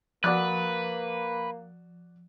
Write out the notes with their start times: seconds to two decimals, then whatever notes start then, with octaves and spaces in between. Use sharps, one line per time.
0.24 F3 A#3 F#4 B4 D5 F#6